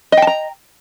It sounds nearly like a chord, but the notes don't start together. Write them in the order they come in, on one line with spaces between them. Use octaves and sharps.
D#5 G5 A5 A#5